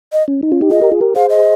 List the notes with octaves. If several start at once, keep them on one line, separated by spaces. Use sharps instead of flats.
D#5
C#4
D#4
C#4 F4
D#4 G4
F4 G#4 D#5
G4 A#4
F4 G#4
G4 A#4
G#4 C5 F5
D#5